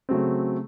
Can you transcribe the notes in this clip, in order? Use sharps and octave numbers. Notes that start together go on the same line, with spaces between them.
C#3 F#3 A3 C4